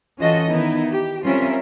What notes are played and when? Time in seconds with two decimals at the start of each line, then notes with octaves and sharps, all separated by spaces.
0.18 E3 C#4 F4 F#4 A4 D#5
0.49 D#3 B3 D#4 E4
0.91 G4
1.23 G3 C4 C#4 F4 A#4 E5